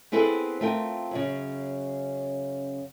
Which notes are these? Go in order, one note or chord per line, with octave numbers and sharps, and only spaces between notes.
B3 C4 E4 G#4 A4 B4
A3 C4 F4 A#4 G5
F#2 C#3